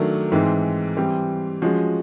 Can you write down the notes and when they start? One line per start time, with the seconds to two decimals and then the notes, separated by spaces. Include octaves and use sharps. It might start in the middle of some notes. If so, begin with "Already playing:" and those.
Already playing: D#3 F#3 A3 D4
0.32 G#2 E3 G#3 C4
0.97 E3 G3 C4
1.62 F3 G#3 C#4 F#4